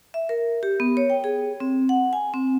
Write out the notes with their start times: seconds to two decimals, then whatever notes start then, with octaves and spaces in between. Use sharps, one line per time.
0.14 E5
0.29 A#4
0.63 G4
0.80 B3
0.97 C#5
1.10 G5
1.24 G#4
1.60 C4
1.89 F#5
2.13 G#5
2.34 C4